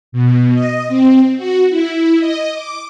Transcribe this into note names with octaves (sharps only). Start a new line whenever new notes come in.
B2
D#5
C4
F#4
E4
D#5
D6